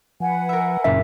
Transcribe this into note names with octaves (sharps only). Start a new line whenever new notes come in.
F3 B4 F#5 G#5
A#4 E5
F#1 A#2 C#4 E5